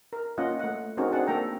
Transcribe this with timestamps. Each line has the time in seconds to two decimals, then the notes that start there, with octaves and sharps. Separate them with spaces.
0.13 A#4
0.38 A#3 C#4 F4 D#5 F#5
0.59 A3 F#5
0.97 C4 C#4 D#4 F#4 G#4 A#4
1.13 C4 D4 G#4 F#5 A5
1.27 A#3 A4 G5 A#5